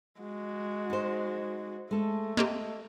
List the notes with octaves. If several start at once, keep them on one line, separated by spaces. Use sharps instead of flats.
G#3 F#4
D#4 C5
G#3 A3 A4
A#3 C4 G4 D#5